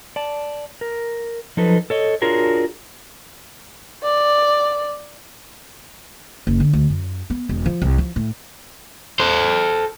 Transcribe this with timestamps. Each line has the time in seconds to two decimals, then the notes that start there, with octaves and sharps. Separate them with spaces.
0.16 D5 A5
0.81 A#4
1.57 F3 F#3 D#4 A4 B4
1.90 A4 C#5 D#5
2.22 D4 F4 F#4 G#4 A#4 C#5
4.04 D5
6.47 F#1
6.60 D3
6.73 D2
6.90 F#2
7.30 B3
7.49 E1
7.66 F3
7.82 C2
7.98 F3
8.16 A2
9.20 A4 C5